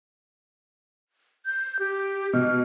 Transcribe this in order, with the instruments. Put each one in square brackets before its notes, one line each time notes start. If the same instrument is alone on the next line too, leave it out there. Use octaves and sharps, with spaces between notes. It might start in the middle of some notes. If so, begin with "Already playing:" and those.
[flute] G6
G4
[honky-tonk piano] B2 [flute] F6